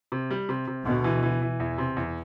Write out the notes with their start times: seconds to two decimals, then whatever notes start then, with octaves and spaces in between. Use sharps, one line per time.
0.12 C3
0.31 G3
0.49 C3
0.67 C3
0.86 D2 B2
1.04 E3
1.23 E3
1.42 E3
1.60 E2
1.78 C3
1.97 E2